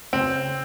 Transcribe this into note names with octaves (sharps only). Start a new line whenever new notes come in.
C#3 C4